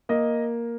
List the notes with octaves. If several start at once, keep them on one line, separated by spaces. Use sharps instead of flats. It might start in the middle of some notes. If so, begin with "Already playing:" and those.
A#3 D#5